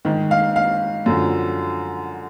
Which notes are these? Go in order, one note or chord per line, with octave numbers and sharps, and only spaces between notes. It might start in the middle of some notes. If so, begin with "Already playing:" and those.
G#2 D#3
F5
F5
F#2 D3 F3